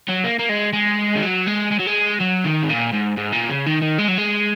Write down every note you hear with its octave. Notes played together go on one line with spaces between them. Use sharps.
F#3
A#3
A#3
G#3
G#3
D#3
F#3
G#3
G#3
F#3
G#3
F#3
D#3
G#2
A#2
G#2
G#2
A#2
C#3
D#3
D#3
G#3
F#3
G#3